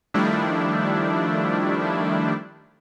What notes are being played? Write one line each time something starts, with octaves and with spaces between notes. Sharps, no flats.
D#3 F3 G3 A3 D4 E4